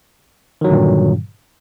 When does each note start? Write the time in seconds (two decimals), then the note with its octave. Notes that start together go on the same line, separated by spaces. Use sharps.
0.61 D#3
0.64 F#3
0.67 D3
0.70 A#2
0.73 G2